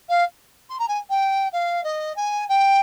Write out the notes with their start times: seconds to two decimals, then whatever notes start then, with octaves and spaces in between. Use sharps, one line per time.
0.09 F5
0.69 C6
0.78 A#5
0.88 G#5
1.09 G5
1.52 F5
1.83 D#5
2.15 G#5
2.48 G5